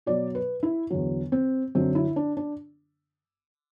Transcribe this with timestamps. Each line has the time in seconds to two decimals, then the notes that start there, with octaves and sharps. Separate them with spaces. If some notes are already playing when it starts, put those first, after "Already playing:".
0.06 B2 F#3 D5
0.35 B4
0.63 E4
0.90 E2 D3 F#3
1.32 C4
1.75 F#2 D3 F#3 C4
1.95 E4
2.16 D4
2.37 D4